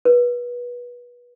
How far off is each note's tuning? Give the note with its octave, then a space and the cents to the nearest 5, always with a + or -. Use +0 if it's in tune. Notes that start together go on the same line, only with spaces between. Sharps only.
B4 -25